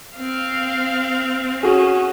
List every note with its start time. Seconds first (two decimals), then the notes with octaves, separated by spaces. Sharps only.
0.17 C4 F5
1.63 C#4 F#4 G#4